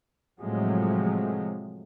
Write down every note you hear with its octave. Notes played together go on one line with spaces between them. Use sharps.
A2 C3 F3 F#3 G#3